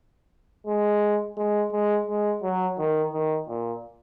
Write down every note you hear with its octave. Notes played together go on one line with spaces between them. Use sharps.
G#3
G#3
G#3
G#3
F#3
D#3
D#3
A#2